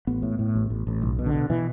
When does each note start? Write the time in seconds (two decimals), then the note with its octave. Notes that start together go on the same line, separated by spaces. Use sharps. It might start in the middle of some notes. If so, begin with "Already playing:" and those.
0.07 A1 B3
0.23 A2
0.39 A2
0.55 A1
0.70 A1
0.87 A1
1.02 B1
1.19 B2
1.26 D3
1.34 B2
1.50 B2 E3